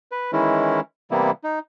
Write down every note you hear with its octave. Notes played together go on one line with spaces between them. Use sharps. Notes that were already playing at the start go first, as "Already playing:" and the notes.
B4
D#3 E3 G#3 C#4 E4
C3 E3 G3 A#3 B3 E4
D#4